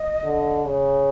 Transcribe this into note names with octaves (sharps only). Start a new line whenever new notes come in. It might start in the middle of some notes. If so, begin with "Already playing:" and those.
Already playing: D#5
D3
C#3